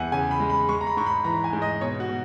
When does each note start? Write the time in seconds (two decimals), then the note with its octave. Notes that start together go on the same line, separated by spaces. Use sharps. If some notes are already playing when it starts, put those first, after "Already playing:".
Already playing: E2 E3 E5 F#5 G#5
0.12 C#3 G#5
0.31 B5
0.40 G#3
0.50 B5
0.69 G#3 C#6
0.81 A#5
0.87 B5
0.97 G#2 C#6
1.06 B5
1.24 E3 A#5
1.44 G#5
1.53 G#2
1.62 D#5
1.81 B2 C#5
2.00 F#4
2.09 B2